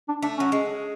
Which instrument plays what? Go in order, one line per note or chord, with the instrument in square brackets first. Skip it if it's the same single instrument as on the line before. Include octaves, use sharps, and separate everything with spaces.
[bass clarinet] D4
[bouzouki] A3 [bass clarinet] D4
[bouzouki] F#3 [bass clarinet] C#4
[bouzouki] G#3